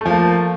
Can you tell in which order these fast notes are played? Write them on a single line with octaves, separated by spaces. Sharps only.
A3 F3 A#3